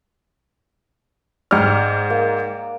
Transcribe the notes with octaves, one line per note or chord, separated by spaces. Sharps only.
G#2 D5 G5 F6
A#3